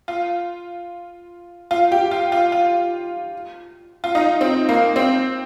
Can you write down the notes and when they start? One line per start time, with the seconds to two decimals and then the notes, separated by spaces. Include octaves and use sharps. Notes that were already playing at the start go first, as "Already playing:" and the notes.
0.08 F4
1.71 F4
1.92 G4
2.11 F4
2.32 F4
2.52 F4
4.04 F4
4.15 D#4
4.41 C4
4.69 A#3
4.96 C4